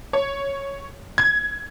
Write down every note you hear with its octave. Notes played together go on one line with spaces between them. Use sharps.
C#5
G#6